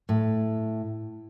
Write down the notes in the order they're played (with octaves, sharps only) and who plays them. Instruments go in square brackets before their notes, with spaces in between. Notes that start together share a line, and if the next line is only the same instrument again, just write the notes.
[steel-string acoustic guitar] A2